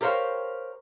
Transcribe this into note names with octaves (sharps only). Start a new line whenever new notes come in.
G4 A#4 C5 C#5 F5